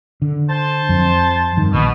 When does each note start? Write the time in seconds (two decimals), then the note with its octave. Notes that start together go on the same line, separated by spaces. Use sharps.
0.22 D3
0.49 C5 A5
0.89 F2
1.57 G2 D#3
1.73 A#1 B2